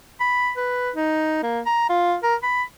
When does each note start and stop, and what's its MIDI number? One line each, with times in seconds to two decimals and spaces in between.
0.20 0.52 83
0.57 0.90 71
0.95 1.39 63
1.43 1.60 58
1.66 1.87 82
1.90 2.15 65
2.23 2.35 70
2.43 2.63 83